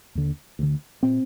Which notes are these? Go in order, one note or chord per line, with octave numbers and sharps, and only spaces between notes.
D#2 D3
D2 D3
A#2 C4